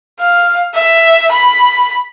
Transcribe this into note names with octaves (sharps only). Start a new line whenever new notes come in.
F5
E5
B5